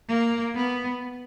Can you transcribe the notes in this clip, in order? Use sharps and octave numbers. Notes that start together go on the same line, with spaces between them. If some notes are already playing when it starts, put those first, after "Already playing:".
A#3
B3